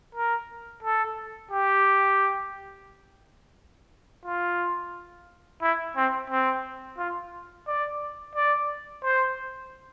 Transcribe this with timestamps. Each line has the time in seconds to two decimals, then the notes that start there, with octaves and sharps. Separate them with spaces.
0.15 A#4
0.83 A4
1.51 G4
4.26 F4
5.62 E4
5.97 C4
6.30 C4
6.98 F4
7.68 D5
8.35 D5
9.04 C5